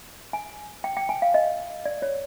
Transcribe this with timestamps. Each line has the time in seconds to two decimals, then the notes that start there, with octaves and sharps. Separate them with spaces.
0.33 G#5
0.84 G5
0.97 G5
1.09 G#5
1.22 F5
1.34 D#5
1.85 D5
2.02 C#5